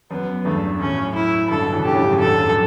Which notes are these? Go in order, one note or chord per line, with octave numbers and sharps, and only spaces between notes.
F#2 B3
E2 G2 A3
F#2 A2 C#4
E4
G2 B2 A4
B2 D3
C#3 E3
B2 D3 G4
A2 C#3
G2 B2
F#2 A2
E2 G2 A4
F#2